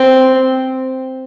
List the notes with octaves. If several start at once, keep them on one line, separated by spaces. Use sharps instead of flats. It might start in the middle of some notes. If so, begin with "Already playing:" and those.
Already playing: C4